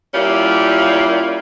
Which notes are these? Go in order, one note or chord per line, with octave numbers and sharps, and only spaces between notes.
G3 A#3 C#4 E4 F4